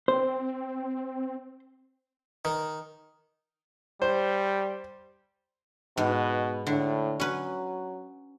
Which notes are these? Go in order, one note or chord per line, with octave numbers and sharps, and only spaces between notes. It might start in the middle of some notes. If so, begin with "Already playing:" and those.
C4 C5
D#3
G3 C5
G#2 B2
A2 D3
F#3 C#4 B4